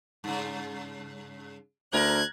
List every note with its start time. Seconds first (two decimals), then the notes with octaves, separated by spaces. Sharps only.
0.24 G2 C#3
1.93 D2 A#4 F#6 G#6